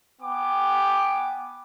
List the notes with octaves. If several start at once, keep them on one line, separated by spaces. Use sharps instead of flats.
B3 G5 G#5 D6